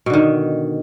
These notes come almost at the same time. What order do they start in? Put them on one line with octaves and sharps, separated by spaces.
B2 D3 D#3